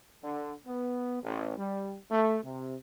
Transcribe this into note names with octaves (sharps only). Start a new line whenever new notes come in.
D3
B3
A1
G3
A3
C3